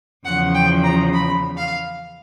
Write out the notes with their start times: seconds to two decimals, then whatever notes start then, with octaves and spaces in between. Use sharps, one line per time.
0.25 E2 C#3 F3 F#5
0.54 G5
0.84 A#5
1.13 B5
1.58 F5